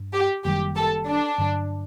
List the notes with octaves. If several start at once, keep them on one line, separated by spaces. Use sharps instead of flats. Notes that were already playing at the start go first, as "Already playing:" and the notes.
Already playing: G2
G4
F#1 F#2 D#3 G3 G4
A4
D4
G2 D3 F#3